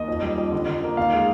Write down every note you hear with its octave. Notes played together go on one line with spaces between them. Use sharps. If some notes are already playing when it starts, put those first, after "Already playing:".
Already playing: D#2 D#5
F2
G3
F2
D3
D3
A#3
D#2 F5
G#3